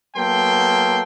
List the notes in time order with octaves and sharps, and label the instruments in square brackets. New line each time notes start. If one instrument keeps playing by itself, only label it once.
[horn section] F#3 A#3 B3 A4 G5 C6